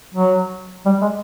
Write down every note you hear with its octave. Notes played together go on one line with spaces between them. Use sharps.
F#3
G3
G#3